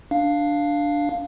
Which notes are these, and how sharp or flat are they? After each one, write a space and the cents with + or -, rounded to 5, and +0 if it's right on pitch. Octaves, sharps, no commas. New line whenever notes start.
D4 +0 F5 +0